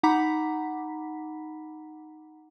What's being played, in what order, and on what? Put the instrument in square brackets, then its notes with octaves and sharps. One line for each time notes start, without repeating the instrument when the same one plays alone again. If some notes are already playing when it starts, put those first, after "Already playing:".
[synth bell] D#4 F#5 A#5 B5 D6 B6